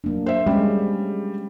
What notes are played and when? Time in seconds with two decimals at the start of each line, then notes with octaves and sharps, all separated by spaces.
0.04 F#3 A#3 D4
0.26 C5 E5
0.46 G3 G#3 C#4